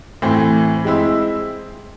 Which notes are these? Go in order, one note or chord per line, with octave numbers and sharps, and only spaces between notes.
A2 E3 C4
G#3 C4 E4